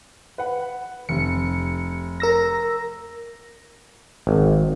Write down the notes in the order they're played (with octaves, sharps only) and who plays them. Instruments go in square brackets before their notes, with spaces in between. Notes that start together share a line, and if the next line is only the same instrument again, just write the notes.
[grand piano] B4 F#5
[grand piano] F1 [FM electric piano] C#7
[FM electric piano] A#4 E6 A#6
[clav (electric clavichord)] G#1